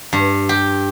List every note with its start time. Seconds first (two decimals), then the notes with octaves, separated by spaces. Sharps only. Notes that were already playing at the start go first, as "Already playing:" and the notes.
0.13 G2
0.49 G4